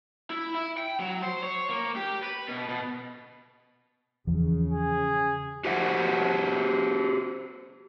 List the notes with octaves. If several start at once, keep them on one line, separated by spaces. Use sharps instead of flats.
E4
E4
G5
F#3
C5
C#5
A#3
G4
B4
B2
B2
E2 C#3 E3 F3
G#4
F#4 G4 C5 E5 F#5